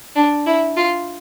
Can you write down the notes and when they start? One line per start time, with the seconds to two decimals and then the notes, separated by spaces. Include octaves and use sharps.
0.15 D4
0.46 E4
0.77 F4